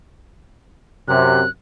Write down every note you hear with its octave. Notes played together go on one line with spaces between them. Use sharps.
F#2 C3 F#6